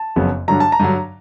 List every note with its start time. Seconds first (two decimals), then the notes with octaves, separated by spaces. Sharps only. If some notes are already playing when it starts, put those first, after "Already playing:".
Already playing: A5
0.16 F#1 F2 C#3 F#3 B3
0.48 G2 D3 F#3 A#5
0.60 A5
0.72 A#5
0.80 G2 D3 F#3